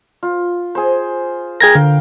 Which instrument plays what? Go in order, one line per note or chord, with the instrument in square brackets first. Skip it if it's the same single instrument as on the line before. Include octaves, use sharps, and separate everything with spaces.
[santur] F4
G#4 C5
[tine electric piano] G#4 G#6 A#6 [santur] A#4 G5
[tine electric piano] D3 [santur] F5